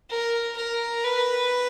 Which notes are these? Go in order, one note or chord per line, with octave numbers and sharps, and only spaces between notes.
A#4
A#4
B4